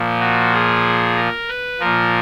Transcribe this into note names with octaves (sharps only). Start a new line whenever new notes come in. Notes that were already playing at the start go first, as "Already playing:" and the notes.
Already playing: A#2 F3
F#4
G#4
A#4
B4
A#2 F3 A#4